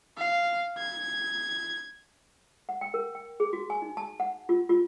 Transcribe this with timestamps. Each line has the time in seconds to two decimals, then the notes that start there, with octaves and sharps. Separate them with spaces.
0.18 F5
0.78 G#6
2.69 F#5
2.81 G5
2.94 A#4
3.15 G5
3.40 G#4
3.53 F#4
3.70 G#5
3.82 D#4
3.97 A5
4.20 F#5
4.49 F4
4.69 F4